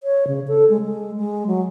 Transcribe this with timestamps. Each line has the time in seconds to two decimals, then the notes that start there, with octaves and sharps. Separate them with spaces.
0.03 C#5
0.27 C#3
0.48 A4
0.70 G#3
0.83 G#3
1.17 G#3
1.47 F#3